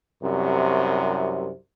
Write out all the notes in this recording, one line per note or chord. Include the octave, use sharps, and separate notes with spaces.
C2 F#2 C3